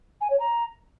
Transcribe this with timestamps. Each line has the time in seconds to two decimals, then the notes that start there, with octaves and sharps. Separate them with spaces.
0.21 G#5
0.30 C#5
0.39 A#5